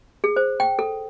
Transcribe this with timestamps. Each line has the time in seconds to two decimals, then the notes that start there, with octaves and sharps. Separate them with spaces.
0.24 G#4
0.36 C5
0.60 G5
0.79 A4